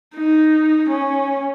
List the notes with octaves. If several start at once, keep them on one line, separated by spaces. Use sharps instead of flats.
D#4
C#4